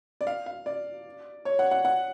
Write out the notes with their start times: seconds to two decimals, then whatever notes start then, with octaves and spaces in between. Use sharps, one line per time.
0.21 D5
0.27 F5
0.46 F5
0.66 D5
1.45 C#5
1.59 F#5
1.71 F#5
1.85 F#5